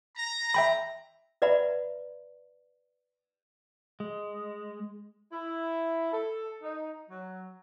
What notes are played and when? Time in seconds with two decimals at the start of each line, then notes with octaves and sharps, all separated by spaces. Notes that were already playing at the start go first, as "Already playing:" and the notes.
0.17 A#5
0.54 E5 G5 B5
1.42 B4 D5 E5 F#5 A#5 B5
4.00 G#3
5.32 E4
6.12 A4
6.62 D#4
7.09 F#3